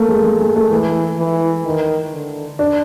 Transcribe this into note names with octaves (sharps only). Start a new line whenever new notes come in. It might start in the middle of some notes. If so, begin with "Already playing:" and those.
Already playing: A3 A#3
G#3
G#3
G#3
A3
E3
E3
D#3
D3
D4